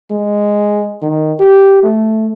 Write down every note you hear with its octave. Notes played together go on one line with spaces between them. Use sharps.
G#3
D#3
G4
A3